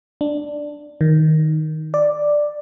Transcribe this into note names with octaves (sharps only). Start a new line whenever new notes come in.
D4
D#3
D5